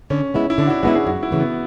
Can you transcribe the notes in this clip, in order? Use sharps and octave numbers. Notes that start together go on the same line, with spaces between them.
D3 C#4
G#3 B3 E4
E4
D3 D4
F#4
E4
G#3 B3 E4 F#4
G#4
F#2 F#4
E4
C#3 E3 A3
B3